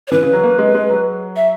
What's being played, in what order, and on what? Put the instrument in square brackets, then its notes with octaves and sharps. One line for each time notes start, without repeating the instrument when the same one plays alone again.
[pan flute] C#5
[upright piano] E3 [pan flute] B4
[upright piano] C#3
F#3
A#3
G#3
G#3
F#3
[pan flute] E5